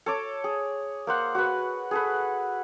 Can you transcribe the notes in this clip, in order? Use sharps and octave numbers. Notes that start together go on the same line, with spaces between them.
A4 C#5 D6
G#4
A#3 C5 F#5
F#4 B4
G#4 A4 B4